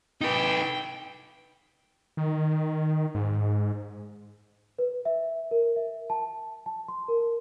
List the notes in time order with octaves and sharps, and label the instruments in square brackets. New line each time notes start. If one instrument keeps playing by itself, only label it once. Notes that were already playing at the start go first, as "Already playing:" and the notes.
[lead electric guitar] D#4 B4 [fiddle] G5
[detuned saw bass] D#3
G#2
[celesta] B4
E5
A#4
E5
A5
A5
C6
A#4